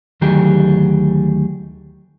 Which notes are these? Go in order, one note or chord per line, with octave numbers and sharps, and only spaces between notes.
D2 D#3 F#3 A3 G4 G#4